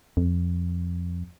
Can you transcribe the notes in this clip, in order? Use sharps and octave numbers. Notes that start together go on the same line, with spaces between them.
F2